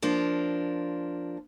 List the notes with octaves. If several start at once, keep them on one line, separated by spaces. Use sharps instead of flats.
F3 A#3 D4